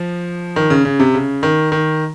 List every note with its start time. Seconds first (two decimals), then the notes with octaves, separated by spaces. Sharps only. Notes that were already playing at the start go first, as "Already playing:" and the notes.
Already playing: F3
0.56 D#3
0.70 C#3
0.85 C#3
1.00 C3
1.14 C#3
1.43 D#3
1.72 D#3